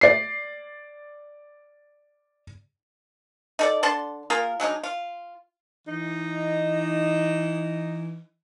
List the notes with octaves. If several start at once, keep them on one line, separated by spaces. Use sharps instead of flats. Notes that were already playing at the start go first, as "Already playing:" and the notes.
D5 C7
D#4 A4 D5
D3 D5 A5 C6
A#3 F4 G#4 A#4
F#3 G#3 D4 D#4
F4
E3 D#4